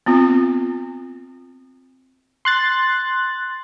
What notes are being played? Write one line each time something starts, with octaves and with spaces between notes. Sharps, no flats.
B3 C4 F4
C6 F#6 A6